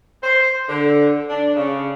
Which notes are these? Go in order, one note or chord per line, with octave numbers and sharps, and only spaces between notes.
C5
D3
D4
C#3